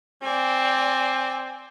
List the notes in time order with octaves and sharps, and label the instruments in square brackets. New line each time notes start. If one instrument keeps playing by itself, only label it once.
[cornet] C4 [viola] D5 G#5